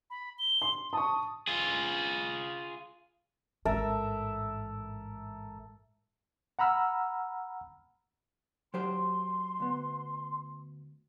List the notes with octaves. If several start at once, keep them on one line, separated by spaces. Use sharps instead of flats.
B5
G7
C6
A5 C#6 D#6
F4 G#4
A1 G#2 A4 A#4 E5
F#5 A#5 B5 E6 F6
F#3 G4 C5 C6
D2 B3